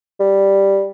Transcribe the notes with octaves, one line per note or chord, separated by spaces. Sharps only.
G3